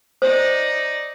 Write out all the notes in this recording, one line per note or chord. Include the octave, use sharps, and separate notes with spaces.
D#4 C5 D5